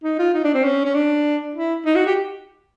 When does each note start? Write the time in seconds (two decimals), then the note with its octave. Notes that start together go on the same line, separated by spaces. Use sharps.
0.04 D#4
0.19 F4
0.34 D#4
0.44 D4
0.54 C4
0.64 C#4
0.85 C#4
0.95 D4
1.55 E4
1.86 D#4
1.95 F#4
2.06 G4